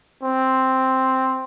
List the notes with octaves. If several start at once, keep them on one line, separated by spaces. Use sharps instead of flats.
C4